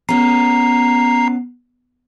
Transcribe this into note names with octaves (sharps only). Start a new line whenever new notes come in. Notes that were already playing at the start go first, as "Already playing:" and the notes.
B3 C#4 A#5 C7